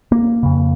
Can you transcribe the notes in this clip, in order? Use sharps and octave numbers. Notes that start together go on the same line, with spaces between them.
A#3
F2 C#3